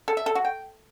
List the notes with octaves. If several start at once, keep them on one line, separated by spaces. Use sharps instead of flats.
A4
E5
A4
F#4
G5